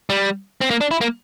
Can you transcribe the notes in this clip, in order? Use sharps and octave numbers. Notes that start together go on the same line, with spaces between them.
G3
C4
A#3
D4
E4
A#3